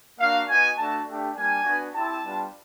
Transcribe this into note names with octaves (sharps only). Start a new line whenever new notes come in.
A#3 D4 F#4 F5
B3 D#4 F#4 G#5
A3 D4 F#4 A5
A3 D4 G4
G3 A#3 D4 G#5
B3 D4 F#4
C4 E4 G4 A5
G3 B3 D4 F4